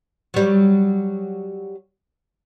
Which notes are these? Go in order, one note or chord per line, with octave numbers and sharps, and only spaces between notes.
F#3 G3